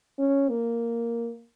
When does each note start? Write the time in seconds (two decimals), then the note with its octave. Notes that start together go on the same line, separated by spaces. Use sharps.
0.18 C#4
0.49 A#3